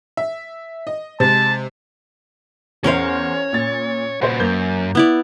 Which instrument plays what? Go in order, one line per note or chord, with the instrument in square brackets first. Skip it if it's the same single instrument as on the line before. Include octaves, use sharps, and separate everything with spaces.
[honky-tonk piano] E5
D#5
[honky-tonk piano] C3 G#3 [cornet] A5
[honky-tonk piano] E2 C5 [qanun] C#4 A#4 F5 [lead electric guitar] C#5
[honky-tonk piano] A#2 A6
[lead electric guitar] A#2 F#4 [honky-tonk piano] B4 C5
[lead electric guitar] F#2 [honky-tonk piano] A#3 G6
[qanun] B3 E4 D5